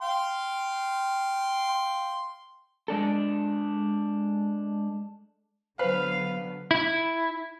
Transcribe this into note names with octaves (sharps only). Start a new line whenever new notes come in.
F5 G5 C6
G#3 D4 A4
D3 F#3 B3 B4 C5 F5
E4